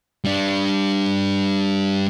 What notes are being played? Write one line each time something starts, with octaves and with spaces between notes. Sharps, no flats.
G3 D4